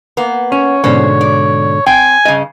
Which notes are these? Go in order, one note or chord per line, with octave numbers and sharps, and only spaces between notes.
A#3 B3
C#4 C#5
G#2 B2 D3 C#4 C5
D5
C4 G5 G#5
G2 C#3 D#5